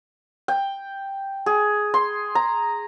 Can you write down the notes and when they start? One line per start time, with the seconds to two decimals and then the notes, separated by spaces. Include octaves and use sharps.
0.48 G5
1.46 G#4
1.94 C6
2.35 A#5